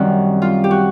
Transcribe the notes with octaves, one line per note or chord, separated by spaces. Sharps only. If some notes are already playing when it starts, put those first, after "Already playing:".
Already playing: F#2 D#3 G3 C4 F#4
F4
G4
F#4